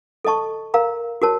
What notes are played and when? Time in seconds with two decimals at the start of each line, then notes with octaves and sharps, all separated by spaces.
0.25 A4 D#5 A5 C#6
0.74 A#4 F5 A#5
1.22 F#4 A#4 C#5 A5